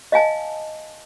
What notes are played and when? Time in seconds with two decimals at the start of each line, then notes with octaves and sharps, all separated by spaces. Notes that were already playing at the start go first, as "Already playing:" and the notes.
0.12 D#5 F5 G#5 A5